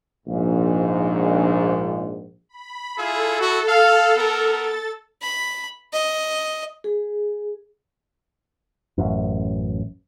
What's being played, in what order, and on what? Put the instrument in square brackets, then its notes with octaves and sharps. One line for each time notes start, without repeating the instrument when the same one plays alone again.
[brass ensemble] A#1 G#2
[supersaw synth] B5
[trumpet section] E4 F4 G#4 [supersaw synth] A4
[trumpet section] E4 F#4
F5
B3 A#4
[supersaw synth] A6
[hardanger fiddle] B5
D#5
[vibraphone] G#4
[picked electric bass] A1 F#2